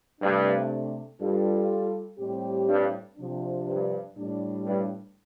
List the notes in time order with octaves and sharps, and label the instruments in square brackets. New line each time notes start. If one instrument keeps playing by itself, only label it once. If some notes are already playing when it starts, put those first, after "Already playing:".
[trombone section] G2 [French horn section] C3 A3 D4
[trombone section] G2 [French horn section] G3 F4 A4
[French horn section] A2 G3 C4 G4
[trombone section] G2
[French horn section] C3 F3 D4
[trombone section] G2
[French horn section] A2 G3 D4
[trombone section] G2